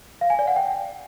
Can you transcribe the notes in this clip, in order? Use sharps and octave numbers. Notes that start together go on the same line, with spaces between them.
F5
G#5
D5
F#5
G5